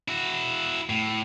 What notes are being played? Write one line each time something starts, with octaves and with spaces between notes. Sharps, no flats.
E4 F#4
A2